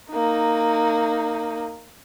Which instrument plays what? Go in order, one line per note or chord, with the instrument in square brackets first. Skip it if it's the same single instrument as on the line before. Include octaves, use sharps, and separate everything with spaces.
[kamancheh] A#3 D#4